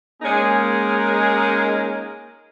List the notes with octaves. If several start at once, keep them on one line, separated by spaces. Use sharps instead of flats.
G#3 A#3 C#4 D#4 G#4 A#4